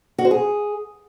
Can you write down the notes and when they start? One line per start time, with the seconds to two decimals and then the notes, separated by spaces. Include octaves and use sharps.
0.18 F#4
0.25 C5
0.31 G#4